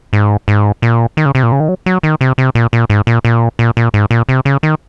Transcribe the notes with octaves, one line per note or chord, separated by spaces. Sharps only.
G#2
G#2
A#2
D#3
C#3
C3
A#2
C#3
D#3
F#3
F#3
D#3
C3
C3
A#2
A#2
G#2
A#2
A#2
A#2
A#2
G#2
A#2
C3
C#3
D#3